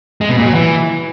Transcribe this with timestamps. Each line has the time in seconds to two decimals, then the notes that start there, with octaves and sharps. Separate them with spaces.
0.21 G#3
0.29 B2
0.38 A#2
0.46 F#3
0.54 E3